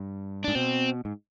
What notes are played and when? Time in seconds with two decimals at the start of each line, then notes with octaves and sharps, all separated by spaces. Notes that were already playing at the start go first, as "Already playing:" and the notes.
Already playing: G2
0.44 G#2 D4
0.55 B2 C4
1.05 G#2